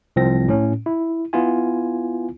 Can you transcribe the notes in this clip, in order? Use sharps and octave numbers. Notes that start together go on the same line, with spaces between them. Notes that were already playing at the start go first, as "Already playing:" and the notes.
C2 F3 C4 A#6
A2 C#4
E4
B3 E4 F4 G#5